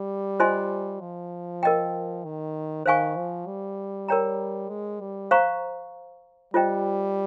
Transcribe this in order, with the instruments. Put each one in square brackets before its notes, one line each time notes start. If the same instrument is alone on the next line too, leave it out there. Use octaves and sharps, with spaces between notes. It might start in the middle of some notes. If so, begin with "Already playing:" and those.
Already playing: [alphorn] G3
[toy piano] F4 C5 D#5 G#5 C6
[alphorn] F3
[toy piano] A#4 D#5 G5
[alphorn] D#3
[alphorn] D#3 [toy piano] C5 F5 G#5 C#6
[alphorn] F3
G3
[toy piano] A#4 C#5 G5 A#5
[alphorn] G#3
G3
[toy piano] C5 F5 A#5 C#6
[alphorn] G3 [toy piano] F4 C5 D#5 G5